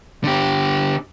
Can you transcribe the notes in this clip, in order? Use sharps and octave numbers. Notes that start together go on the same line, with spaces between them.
D3 G4